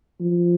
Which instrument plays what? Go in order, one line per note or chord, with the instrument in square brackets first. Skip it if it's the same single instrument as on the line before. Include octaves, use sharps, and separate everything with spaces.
[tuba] F3